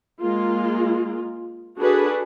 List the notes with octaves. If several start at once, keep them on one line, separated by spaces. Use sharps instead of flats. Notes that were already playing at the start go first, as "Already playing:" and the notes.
G#3 A#3 F4
D4 F#4 G#4 A4 B4